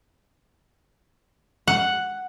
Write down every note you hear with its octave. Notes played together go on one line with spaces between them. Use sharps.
F#5